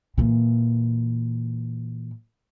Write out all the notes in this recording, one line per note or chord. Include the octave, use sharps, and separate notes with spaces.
A#2 E3